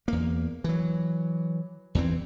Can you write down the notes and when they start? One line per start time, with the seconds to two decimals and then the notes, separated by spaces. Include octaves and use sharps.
0.08 E2 A#3
0.64 E3 F#3
1.95 E2 E3 C4